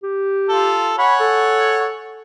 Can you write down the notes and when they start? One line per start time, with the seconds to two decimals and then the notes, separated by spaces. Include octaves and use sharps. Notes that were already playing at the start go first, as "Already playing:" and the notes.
0.03 G4
0.49 F4 A4
0.98 C#5 F#5 G#5 B5
1.20 A4